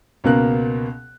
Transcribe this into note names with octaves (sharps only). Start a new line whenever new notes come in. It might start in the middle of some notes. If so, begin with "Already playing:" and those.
C#2 B2 A#3 B3 A#4 F#6